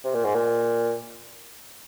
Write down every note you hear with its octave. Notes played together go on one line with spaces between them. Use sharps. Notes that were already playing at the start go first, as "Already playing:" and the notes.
C3
A#2
G#2
A#2